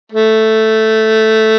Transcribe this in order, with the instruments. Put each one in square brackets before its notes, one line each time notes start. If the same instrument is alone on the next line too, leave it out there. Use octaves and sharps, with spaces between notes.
[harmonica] A3